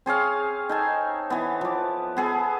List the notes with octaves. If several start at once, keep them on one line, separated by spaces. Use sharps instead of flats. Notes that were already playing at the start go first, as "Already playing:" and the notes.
C4 G#4 C#5 F5
D#4 A4 G#5
E3 B3
F3 D6
B3 G#4 A4